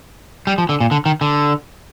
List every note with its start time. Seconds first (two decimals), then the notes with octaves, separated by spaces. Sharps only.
0.47 G3
0.58 F3
0.69 D3
0.80 A#2
0.91 D3
1.06 D#3
1.21 D3